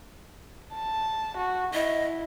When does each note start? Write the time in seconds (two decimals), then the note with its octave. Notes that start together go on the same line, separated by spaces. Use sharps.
0.73 A5
1.37 F#4
1.74 E4 D#5